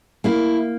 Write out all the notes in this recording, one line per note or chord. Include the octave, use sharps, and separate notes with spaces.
A#3 E4